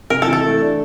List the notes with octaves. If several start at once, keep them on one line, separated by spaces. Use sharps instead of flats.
C3 A#4
A4
E3
A4
A3
D4